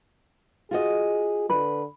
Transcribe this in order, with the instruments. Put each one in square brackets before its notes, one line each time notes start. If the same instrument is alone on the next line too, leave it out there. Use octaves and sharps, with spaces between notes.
[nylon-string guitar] F4 F#4 D#5 [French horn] G#4
[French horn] D3 [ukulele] B4